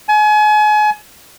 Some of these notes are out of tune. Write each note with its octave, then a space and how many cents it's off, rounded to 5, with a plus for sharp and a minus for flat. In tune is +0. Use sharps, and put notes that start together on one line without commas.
G#5 +35